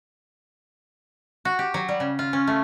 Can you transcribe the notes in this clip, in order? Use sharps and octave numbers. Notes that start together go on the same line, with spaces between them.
F#4
G4
F#3
G3
C#3
F4
C#4
A3